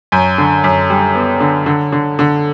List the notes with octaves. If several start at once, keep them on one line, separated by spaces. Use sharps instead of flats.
F#2
D3
F#2
G3
B3
D3
D3
D3
D3